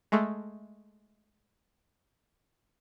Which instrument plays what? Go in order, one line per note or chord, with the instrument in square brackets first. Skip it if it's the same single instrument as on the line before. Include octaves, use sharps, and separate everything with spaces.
[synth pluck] G#3 A3